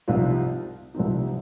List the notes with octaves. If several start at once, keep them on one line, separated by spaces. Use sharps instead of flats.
C2 C3 F3 C4 D#4 F4
C2 C3 F3 C4 D#4